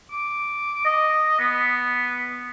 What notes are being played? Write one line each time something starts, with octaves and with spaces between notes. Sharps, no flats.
D6
D#5
B3